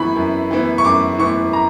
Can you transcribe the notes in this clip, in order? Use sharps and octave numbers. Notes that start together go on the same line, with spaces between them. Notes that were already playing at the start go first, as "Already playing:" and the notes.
Already playing: F#2 E3 B3 E4 B5 C#6
F#2
E3 B3 E4
C#6
F#2 D6
E3 B3 E4 C#6
A#5